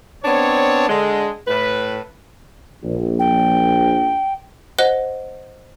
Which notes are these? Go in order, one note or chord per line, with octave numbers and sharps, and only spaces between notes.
B3 C4 D4 C#5
D3 G#3
A2 B4
A#1
G5
C5 D#5 F#5 F#6 G7